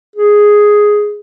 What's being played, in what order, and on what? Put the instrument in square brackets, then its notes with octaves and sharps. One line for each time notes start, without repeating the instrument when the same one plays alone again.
[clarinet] G#4